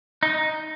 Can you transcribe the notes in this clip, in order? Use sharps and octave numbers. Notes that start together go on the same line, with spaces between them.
D#4